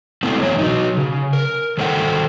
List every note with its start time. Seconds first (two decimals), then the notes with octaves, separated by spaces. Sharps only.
0.23 G#3 A3 B3 C4 E4
0.42 F#2 E3 C#5
0.58 F#3 D#4
0.97 C#3
1.33 A#4
1.78 D#3 A4 C5 D#5 F#5 G5